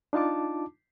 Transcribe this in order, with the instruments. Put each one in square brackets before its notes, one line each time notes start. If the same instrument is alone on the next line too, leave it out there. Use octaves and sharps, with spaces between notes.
[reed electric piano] D4 D#4 F4 A5 D6